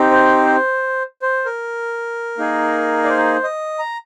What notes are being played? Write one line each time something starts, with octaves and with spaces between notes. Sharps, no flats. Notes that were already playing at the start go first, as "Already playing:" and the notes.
Already playing: C4 D#4 G4
C5
C5
A#4
A#3 D#4 G#4
D5
C5
D#5
A#5